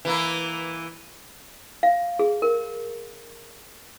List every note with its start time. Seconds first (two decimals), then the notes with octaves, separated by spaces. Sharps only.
0.05 E3 A#3 E4
1.83 F5
2.19 G#4
2.42 A#4